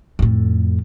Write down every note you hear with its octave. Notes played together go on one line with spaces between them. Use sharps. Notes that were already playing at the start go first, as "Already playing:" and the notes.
F2 A2